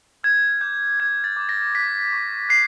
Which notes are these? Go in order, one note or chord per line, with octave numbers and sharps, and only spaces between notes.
F6 G#6
D6 G6
F6 G#6
A6
D6
A#6
F#6 B6
C#6
F#6 C7